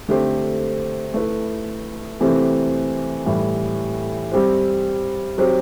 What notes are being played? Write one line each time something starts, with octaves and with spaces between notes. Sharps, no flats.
D3 A3 C4 G4 C5
A3 E4 B4
C3 E3 A3 C4 G4
A2 E3 G3
G3 C4 G4 C5
F#3 C4 G4 C5